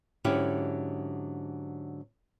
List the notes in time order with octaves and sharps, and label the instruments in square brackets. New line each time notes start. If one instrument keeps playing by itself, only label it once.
[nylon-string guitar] G#2 D3 F#3 C#4 E4 G4